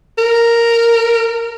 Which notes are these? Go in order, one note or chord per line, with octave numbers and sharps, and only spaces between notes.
A#4